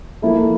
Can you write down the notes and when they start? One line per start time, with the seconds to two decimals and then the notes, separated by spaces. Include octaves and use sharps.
0.22 F3 A#3 E4 A4